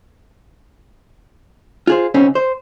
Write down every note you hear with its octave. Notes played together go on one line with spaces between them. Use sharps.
F4 G#4 C5
B1 C#3 C4 C#4
C5